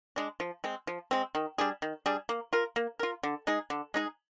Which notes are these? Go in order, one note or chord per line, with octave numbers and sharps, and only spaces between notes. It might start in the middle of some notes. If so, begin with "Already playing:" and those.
G#3 D4
F3
G#3 C4
F3
G#3 C4
D#3
G3 D4 G#4
D#3
G3 D4 G#4
A#3
F4 A#4
A#3
F4 A#4
D3
G#3 D#4 G#4
D3
G#3 D#4 G#4